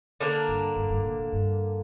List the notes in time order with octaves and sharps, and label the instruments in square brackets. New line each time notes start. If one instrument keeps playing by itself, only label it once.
[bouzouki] D3 A#3 D4 A#4
[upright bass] G2
G2
G2
A#2
A#2
G2